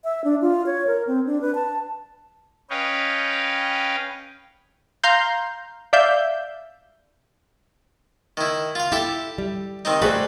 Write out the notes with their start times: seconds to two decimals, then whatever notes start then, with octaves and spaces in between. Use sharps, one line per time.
0.04 E5
0.24 D4
0.41 F4
0.66 C#5
0.87 A#4
1.07 C4
1.26 D4
1.41 B4
1.55 A5
2.70 C#4 B4 C#5 D#5 F5 G5
5.04 F5 A#5 C6 G6
5.93 D5 E5 F5 G6
8.37 D#3 E4
8.75 F4 F5
8.92 E4 G4 A4 E5
9.38 G3
9.85 D#3 C4 D#4
10.02 G3 A3 F#4 G#4 B4 C5